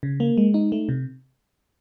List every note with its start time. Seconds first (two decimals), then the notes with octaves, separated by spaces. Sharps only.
0.03 C#3
0.20 A#3
0.37 G#3
0.54 D#4
0.72 A3
0.89 C3